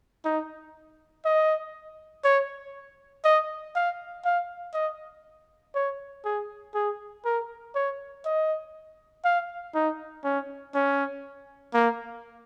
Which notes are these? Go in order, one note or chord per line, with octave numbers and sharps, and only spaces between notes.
D#4
D#5
C#5
D#5
F5
F5
D#5
C#5
G#4
G#4
A#4
C#5
D#5
F5
D#4
C#4
C#4
A#3